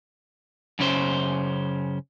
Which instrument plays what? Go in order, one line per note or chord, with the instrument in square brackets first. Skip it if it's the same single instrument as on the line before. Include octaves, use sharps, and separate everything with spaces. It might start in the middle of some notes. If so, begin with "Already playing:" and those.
[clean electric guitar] F#2 C#3 C#4 C5